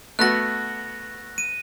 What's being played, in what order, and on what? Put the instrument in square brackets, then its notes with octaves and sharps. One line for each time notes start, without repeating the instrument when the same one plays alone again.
[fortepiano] A3 B3 F#4 [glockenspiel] F#6 A#6
[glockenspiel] D#7